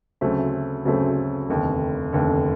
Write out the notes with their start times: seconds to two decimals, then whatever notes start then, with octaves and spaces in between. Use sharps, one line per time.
0.21 D2 C#3 F#3 A3 C4
0.85 D2 C#3 F#3 A3 C4
1.49 F1 D#2 D3
2.13 F1 D#2 D3